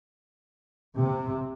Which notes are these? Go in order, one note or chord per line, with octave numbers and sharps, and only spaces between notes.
C3